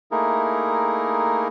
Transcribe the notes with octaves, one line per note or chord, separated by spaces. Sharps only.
A3 A#3 D#4 E4 G#4 A#4